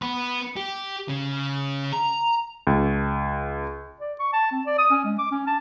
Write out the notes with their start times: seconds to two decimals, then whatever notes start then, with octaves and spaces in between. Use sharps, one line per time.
0.02 B3 B4
0.57 G4
1.08 C#3
1.93 A#5
2.67 C#2
4.00 D5
4.20 C#6
4.33 A5
4.52 C4
4.66 D5
4.79 D#6
4.91 C#4
5.05 G#3
5.19 D6
5.31 C#4
5.47 A5